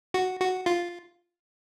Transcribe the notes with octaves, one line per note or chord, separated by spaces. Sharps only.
F#4
F#4
F4